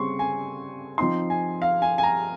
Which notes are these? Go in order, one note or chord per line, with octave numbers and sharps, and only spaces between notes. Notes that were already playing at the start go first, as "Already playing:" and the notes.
Already playing: C#3 G3 C4 C6 C#6
G#5
F3 C4 D#4 C6
G#5
F5
G#5
G#5
A#5